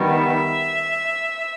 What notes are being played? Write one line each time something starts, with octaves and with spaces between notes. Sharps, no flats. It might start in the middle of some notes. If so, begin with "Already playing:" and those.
Already playing: D#3 G3 B3
E5